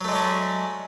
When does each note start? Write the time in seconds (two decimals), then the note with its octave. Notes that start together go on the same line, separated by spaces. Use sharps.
0.01 F#3
0.04 A3
0.08 G#3
0.12 D4
0.15 C#4